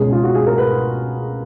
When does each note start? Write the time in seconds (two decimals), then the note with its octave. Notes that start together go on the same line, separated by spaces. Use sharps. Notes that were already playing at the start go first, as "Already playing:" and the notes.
Already playing: C#2 B2 G#3 C#4 G#4
0.12 F4
0.24 F#4
0.35 G#4
0.46 A#4
0.58 B4